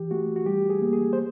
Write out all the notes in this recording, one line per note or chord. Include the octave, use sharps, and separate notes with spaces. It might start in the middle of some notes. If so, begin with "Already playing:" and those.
Already playing: E3 G4
A3 F#4
F#4
G3 G4
G#4
A#3
G#4
C5